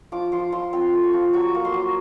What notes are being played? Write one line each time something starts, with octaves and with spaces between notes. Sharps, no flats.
F3 D6
F3 C6
F3 C6
C4 C6
A3
C#6
F3
F#3 C#6
D6
A#3
C6
F#3